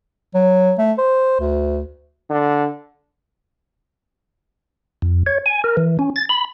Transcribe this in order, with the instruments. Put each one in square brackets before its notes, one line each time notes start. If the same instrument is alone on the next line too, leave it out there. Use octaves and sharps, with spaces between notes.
[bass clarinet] F#3
A3
C5
D2
[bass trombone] D3
[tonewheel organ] F2
C#5
G#5
A#4
E3
C#4
A6
B5